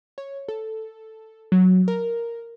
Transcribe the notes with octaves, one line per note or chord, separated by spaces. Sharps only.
C#5
A4
F#3
A#4